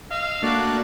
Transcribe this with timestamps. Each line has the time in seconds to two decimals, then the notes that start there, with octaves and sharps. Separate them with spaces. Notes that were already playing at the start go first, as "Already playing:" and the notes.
0.11 D#5 F5 E6
0.43 A3 A#3 D4 F#4 D5 F#6